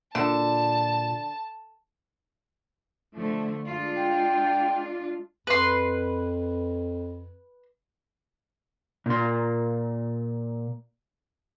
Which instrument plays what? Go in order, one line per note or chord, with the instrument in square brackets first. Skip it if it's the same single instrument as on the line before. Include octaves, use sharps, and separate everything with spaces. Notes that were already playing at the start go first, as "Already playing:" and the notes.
[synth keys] A#2 E7 [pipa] D3 [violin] A5
[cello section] D3 F3 A3
G#3 D4 F4
[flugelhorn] G5
[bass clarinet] F2 [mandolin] B4 C6
[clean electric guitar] A#2 C6